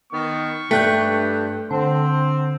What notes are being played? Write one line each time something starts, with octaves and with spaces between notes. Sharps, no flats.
D#3 B3 C#6
G2 A3 G5 F#6 G6
D3 C4 C6